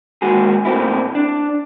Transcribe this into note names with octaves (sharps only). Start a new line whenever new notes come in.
D#3 G#3 A#3 F#4 G#4
A#2 A3 A#3 C4 D#4 E4
D4